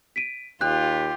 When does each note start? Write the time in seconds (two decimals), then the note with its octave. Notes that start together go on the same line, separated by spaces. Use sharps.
0.16 B6 D7 D#7
0.61 D#2 F4 G4 F#6